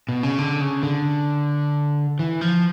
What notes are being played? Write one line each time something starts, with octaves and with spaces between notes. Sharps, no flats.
B2
C#3
D3
C#3
D3
E3
F3